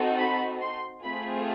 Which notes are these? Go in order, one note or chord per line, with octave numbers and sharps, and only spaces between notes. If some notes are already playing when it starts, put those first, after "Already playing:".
Already playing: C4 D#4 F#4 A4
B5
C6
A3 C4 F4 G#4 B5